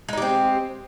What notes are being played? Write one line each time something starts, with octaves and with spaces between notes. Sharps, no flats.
G#3 C4 D#4 G4